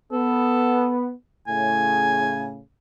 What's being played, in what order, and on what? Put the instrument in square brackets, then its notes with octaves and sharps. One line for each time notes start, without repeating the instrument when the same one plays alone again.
[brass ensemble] B3 [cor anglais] A4
[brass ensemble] A2 C#3 [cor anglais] G#5